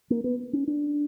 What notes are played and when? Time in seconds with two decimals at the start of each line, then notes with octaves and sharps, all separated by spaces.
0.10 A#3
0.24 B3
0.53 C#4
0.67 D4